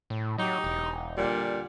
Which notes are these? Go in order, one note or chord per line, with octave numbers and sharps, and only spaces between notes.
A2
F#3 D#4 G4 D#5
E1
A#2 D3 G3